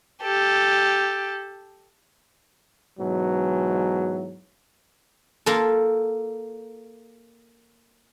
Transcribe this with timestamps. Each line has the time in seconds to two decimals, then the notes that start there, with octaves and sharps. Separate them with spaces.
0.23 G4 A4
2.98 G#2 B2 E3 F#3
5.46 A#3 F4 A4